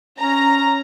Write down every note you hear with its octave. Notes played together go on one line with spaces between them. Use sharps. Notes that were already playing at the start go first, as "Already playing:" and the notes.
C#4 A#5